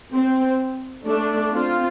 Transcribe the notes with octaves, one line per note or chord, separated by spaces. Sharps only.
C4
A3 D4
C4 F4